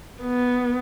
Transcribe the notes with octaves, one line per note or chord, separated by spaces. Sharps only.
B3